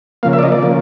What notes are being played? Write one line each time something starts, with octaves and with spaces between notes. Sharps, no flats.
C#3 F3 A#3 F5
E5
D5
D#5
D5
C#3 F3 A#3